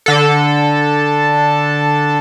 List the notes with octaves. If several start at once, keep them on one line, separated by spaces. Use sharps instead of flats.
D3 A4